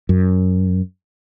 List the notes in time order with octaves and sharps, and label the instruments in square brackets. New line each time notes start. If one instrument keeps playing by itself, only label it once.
[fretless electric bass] F#2